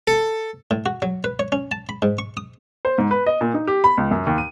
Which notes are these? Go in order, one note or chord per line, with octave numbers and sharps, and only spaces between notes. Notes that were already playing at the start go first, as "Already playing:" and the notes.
A4
A2
F#4
F#3
B4
C#5
C#4
A5
B5
G#2
C#6
D#6
C5
G#2
B4
D#5
A#2
D#4
G4
B5
C#2
F#2
D#2
D#7